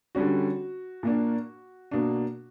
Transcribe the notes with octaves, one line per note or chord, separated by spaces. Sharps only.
D3 G3 C#4 F#4
A#2 A#3 D4
B2 A#3 D4